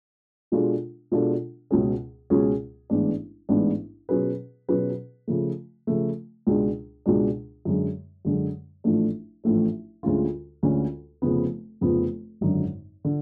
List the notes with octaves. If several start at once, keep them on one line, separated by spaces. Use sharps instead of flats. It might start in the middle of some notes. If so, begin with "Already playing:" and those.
B2 G#3 D4 F4 A4
B2 G#3 D4 F4 A4
C#2 B2 G#3 C#4 G#4
C#2 B2 G#3 C#4 G#4
A1 G#2 G#3 B3 D4
A1 G#2 G#3 B3 D4
B2 F#3 C#4 G#4 B4
B2 F#3 C#4 G#4 B4
C#3 F3 A3
C#3 F3 A3
C#2 B2 G#3 D4
C#2 B2 G#3 D4
F#2 D3 G#3
F#2 D3 G#3
A1 A2 F3 A3 D4
A1 A2 F3 A3 D4
D2 D3 G#3 C#4 F4
D2 D3 G#3 C#4 F4
F1 F2 C#3 F3 B3
F1 F2 C#3 F3 B3
G#1 F#2 D3
D3